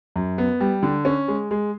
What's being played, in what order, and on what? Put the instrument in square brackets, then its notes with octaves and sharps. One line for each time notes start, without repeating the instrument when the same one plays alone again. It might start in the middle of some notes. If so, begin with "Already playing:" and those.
[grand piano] F#2
B3
G3
D3
C#4
G#3
G#3